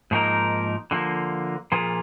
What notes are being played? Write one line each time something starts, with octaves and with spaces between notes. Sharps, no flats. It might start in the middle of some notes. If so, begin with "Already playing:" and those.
G#2 F3 A#3 D#4 A#4
D3 F3 A#3
A#2 F3 A#3 F4 G#4